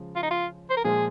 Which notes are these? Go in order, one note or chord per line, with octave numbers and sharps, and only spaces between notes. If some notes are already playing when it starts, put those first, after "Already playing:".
Already playing: C#3 F3 G#3
F4
D#4
F4
C5
A#4
A#2 F3 G#3 G#4